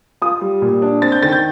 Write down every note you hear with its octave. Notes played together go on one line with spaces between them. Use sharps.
F4 D#6
G3
A#2
D4
C4 A6
G6
D#3 A6
G6